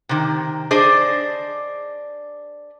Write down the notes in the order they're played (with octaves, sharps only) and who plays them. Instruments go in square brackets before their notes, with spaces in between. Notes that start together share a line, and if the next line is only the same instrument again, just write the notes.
[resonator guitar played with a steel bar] C3 D#3
D4 G#4 C5 D5 D#5